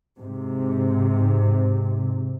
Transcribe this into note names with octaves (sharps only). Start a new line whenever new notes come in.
G#2 C3